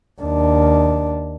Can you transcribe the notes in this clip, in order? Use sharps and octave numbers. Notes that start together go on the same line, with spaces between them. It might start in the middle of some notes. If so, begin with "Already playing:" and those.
D#2 D4